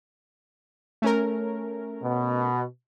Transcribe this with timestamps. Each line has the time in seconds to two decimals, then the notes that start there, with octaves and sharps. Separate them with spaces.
1.02 A3 C#4 A#4
2.02 B2